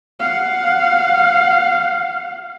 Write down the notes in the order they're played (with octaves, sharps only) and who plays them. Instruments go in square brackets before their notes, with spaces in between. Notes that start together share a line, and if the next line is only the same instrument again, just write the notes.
[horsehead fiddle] F5 F#5